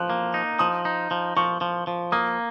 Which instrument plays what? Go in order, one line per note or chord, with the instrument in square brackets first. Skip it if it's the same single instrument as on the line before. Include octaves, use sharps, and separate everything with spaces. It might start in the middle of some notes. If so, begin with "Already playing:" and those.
Already playing: [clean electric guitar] F3 [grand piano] F#6
[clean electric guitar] A#3
D#4
[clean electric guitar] F3 [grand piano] D#6
[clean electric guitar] D#4
F3
[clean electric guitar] F3 [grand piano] C#6
[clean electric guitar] F3
F3
[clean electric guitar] A#3 [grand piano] D#6